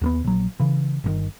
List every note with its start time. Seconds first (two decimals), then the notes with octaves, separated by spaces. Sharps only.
0.02 D#2 A#3 B3
0.24 A#1 F#3
0.60 C#3 E3
1.04 G1 A#2 D#3